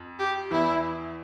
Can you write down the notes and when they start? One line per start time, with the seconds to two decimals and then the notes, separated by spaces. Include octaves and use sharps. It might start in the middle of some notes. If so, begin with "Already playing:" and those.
Already playing: F2
0.19 G4
0.51 E2 E3 E4